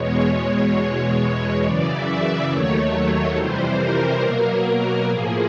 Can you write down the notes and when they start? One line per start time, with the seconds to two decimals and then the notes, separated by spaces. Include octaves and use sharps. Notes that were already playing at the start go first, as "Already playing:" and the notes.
Already playing: E2 B2 G#3 C#5
0.78 E2 B2 G#3
1.64 F#2 C#3 E3 D5
1.93 E5
2.21 D5
2.50 D#2 D#3 F#3 A3 C#5
3.37 F2 C3 E3 G3 C5
3.79 A#4
4.22 B2 F#3 A#3
5.08 A2 F3 A#3 G#4